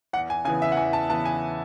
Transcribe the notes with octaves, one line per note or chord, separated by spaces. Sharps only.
E2 F#5
G#5
C#3 E3 B3 G#5
E5
F#5
E2 G#5
A5
C#3 E3 B3 A5
G#5